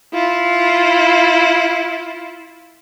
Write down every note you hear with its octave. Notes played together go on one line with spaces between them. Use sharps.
E4 F4